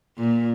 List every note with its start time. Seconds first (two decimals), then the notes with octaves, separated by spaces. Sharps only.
0.18 A#2